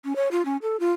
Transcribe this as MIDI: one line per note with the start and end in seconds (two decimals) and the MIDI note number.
0.05 0.16 61
0.16 0.28 73
0.31 0.45 65
0.45 0.57 61
0.62 0.79 69
0.80 0.93 65